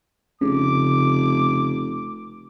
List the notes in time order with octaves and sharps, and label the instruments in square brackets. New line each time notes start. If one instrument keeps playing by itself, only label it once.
[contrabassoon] F1 [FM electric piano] C#3 [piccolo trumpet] D6